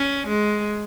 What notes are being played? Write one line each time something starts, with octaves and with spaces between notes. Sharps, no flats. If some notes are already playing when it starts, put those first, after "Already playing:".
Already playing: C#4
G#3